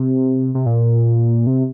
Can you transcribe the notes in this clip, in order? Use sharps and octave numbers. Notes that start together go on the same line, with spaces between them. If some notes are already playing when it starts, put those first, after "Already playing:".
Already playing: C3
C3
A#2
C3